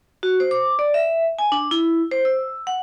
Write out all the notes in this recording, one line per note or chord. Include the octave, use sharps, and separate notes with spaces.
F#4
C5
D6
D5
E5
G#5
D4
E4
C5
E6
F#5